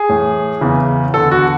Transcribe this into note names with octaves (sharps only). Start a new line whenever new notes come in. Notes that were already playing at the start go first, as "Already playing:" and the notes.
Already playing: G#4
A2 E3
E2 C#3 E3
E2 D3 A4
F#4